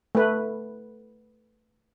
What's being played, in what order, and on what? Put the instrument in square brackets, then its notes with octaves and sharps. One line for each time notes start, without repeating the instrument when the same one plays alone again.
[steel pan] A3 B4